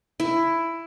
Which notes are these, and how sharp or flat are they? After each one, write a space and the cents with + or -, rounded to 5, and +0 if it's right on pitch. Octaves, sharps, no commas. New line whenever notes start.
E4 +10